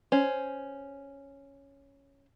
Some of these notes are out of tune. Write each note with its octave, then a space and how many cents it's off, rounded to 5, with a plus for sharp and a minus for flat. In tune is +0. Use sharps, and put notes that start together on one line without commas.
C#4 +0 C5 +0